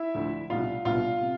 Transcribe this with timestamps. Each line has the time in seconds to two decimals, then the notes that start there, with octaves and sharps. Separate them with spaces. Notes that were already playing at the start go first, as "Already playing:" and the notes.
Already playing: E4 E5
0.15 D2 D3 F3
0.50 C2 B2 B3 D4 F4 F5
0.85 C2 B2 B3 D4 F4 F5
1.21 C3